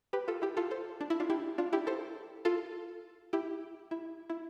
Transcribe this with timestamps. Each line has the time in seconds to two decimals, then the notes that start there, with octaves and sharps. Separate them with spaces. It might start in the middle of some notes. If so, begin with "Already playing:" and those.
0.13 G4 B4
0.28 F4 A4
0.42 E4 G4
0.57 F4 A4
0.71 A4 C5
1.01 D4
1.10 E4
1.20 D4 F4
1.30 E4 G4
1.58 D4 F4
1.73 E4 G4
1.87 A4 C5
2.45 F4 A4
3.33 E4 G4
3.91 E4
4.30 E4